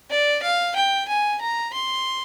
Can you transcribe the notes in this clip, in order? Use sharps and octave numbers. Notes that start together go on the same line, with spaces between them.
D5
F5
G5
G#5
A#5
C6